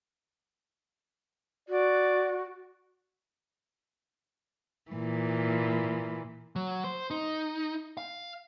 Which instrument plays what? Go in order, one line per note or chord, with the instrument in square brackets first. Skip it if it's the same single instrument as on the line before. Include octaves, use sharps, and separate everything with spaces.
[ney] F#4 [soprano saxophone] D5
[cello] A#2 E3
[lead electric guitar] F#3
C5
D#4
F5